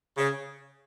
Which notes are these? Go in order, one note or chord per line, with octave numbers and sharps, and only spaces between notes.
C#3